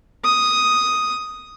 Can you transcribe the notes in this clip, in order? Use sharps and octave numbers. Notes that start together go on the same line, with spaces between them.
D#6